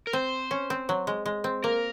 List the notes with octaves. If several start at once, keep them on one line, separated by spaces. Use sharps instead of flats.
A#4
C4 C5
C#4
C4
F#3
G#3
G#3
C4
A#3 A#4